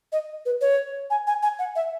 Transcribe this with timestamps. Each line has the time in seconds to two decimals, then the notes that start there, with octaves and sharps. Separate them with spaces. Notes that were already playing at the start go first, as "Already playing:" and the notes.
0.12 D#5
0.46 B4
0.61 C#5
1.10 G#5
1.27 G#5
1.43 G#5
1.59 F#5
1.76 E5